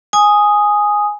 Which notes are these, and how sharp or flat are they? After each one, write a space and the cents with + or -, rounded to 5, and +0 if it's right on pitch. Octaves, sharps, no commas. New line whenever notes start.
G#5 +0 D#6 +0